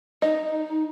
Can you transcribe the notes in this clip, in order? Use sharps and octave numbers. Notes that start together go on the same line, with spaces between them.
D#4 D#5